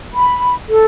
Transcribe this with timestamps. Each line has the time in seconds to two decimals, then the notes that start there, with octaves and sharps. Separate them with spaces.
0.14 B5
0.71 A4